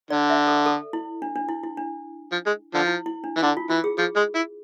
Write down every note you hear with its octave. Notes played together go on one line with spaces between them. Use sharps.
D3 D5
E5
A4
A4
E4
D4
D4
E4
E4
D4
F3
G#3
D3 F3
E4
E4
D4
E3
D3 E4
F4
E3 F4
G#4
F3 G#4
G#3
E4